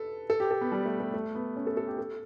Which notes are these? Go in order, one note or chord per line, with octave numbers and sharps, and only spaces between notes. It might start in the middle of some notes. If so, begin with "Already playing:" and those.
Already playing: A4 B4
A4
G4
A4
B3
G3
A3
A3
A3
B3
C#4
A4
A4
G4
A4